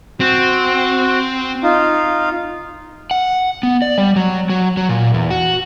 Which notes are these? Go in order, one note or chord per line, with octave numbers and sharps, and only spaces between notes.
C4 F#4
D#4 F4 F5
F#5
B3
D5
G3
F#3
F#3
F#3
A#2
E2
F#4